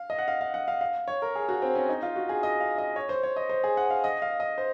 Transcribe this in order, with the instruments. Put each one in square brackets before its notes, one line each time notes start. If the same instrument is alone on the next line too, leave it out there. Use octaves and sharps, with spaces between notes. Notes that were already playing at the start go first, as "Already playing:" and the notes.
Already playing: [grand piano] F5
D#5
F#5
F5
F5
F#5
F5
F5
C#5
A#4
G#4
F#4
C4
C#4
D#4
F4
F#4
G#4
D#5
F5
D#5
C#5
C5
C#5
D#5
C5
G#4
F#5
F5
D#5
F5
D#5
C5